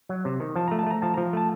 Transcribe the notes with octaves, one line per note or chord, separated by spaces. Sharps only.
F#3
C3
D#3
F3 A5
A3 A#5
A5
A3 A#5
F3 A5
F3 A#5
A3 A5